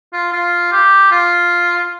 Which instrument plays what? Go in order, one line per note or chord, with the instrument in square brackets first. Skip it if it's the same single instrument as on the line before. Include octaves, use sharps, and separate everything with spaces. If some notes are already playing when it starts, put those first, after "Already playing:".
[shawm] F4
F4
G4
F4